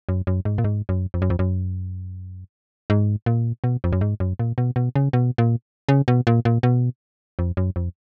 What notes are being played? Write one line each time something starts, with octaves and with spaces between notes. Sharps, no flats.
F#2
F#2
G#2
A#2
G#2
F#2
F2
F#2
F2
F#2
G#2
A#2
B2
F2
F#2
G#2
F#2
A#2
B2
B2
C#3
B2
A#2
C#3
B2
A#2
A#2
B2
F2
F#2
F2